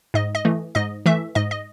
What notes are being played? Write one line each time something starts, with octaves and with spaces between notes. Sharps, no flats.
G#2 D#5
D#5
E3 A3
G#2 D#5
E3 A3 E5
G#2 D#5
D#5